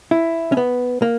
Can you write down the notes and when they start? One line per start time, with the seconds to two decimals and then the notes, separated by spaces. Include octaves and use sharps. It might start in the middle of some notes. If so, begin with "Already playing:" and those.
0.11 E4
0.52 C#4
0.57 B3
1.02 A#3